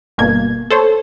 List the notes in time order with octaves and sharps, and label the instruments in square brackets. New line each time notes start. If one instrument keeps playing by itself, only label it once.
[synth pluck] G1 B2 A#3 G#6
A4 C5 C#5